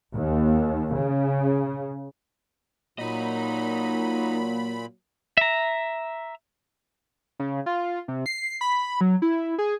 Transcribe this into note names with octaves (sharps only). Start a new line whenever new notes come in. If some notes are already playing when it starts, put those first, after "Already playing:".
D#2
C#3
A#2 F#3 A#3 D#4 D#5 B5
E5 A#5
C#3
F4
C3
C7
B5
F#3
E4
G#4